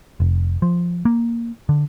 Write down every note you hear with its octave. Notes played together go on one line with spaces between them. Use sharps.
F1
F3
A#3
D3